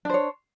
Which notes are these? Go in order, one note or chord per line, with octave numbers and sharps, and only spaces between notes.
D4 C5 C#5